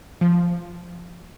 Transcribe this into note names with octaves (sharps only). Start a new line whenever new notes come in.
F3